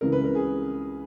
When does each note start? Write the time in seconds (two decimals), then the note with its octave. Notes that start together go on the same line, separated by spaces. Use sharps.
0.01 C#2 C#3 E3 A#4
0.12 B4
0.24 A#4
0.35 G#4